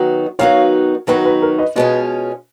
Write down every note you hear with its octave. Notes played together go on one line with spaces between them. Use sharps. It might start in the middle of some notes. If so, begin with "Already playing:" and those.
Already playing: D#3 F#3 B3 D#4 F#4
D#3 F#3 B3 D#4 F#4 C#5 F5
D#3 F#3 B3 D#4 F#4 B4
B4
A#4
B4 D#5
B2 G#3 C#4 F4 B4 D#5